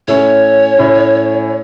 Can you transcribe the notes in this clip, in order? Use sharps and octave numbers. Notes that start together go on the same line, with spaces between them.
A2 A3 C#4 C#5
A2 A3 C#4